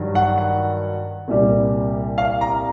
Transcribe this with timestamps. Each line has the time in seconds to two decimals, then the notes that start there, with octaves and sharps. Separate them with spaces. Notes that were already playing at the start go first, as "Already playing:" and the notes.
Already playing: G2 D#3 F#3
0.15 F#5
0.38 F#5
1.28 C2 A#2 G3
2.18 F5
2.41 A#5